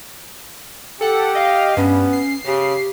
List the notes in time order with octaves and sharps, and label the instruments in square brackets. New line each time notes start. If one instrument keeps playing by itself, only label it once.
[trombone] G4 [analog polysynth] A4 F#5
[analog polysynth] D#5 F5
[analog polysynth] G2 [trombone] B3 [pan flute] C#4
[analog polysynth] C7
[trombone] C#3 [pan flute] G4